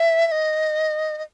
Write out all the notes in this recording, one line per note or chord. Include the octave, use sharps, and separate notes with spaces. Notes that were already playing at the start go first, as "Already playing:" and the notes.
Already playing: E5
E5
D#5
D#5